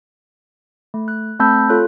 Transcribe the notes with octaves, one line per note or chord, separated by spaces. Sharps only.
A3
F#6
A3 C4 A5 B5 E6 G6
F4 A4 C#5 F#6